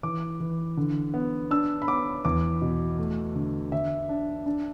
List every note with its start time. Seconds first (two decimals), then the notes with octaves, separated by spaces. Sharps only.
0.03 E3 D6
0.40 E3
0.77 D3
1.14 B3
1.51 D4 E6
1.82 B5
1.88 B3 D6
2.25 E2 D6
2.61 B2
2.98 A3
3.35 D3
3.72 D3 E5
4.09 D4
4.46 D4